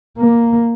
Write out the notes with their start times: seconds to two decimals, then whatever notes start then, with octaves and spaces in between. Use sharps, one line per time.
0.18 A#3